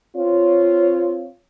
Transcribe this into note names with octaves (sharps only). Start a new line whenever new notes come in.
C4 F4 C#5